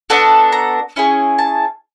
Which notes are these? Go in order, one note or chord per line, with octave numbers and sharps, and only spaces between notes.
B3 D4 F#4 A4
A#5
C#4 E4 G#4
A5